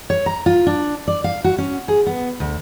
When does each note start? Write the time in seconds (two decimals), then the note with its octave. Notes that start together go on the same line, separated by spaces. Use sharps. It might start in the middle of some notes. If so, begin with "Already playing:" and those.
0.10 C#5
0.26 A#5
0.46 F4
0.66 D4
1.08 D5
1.24 F5
1.44 F#4
1.58 C#4
1.88 G#4
2.07 B3
2.40 D2